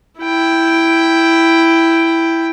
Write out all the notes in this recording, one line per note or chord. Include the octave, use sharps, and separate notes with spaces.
E4 G5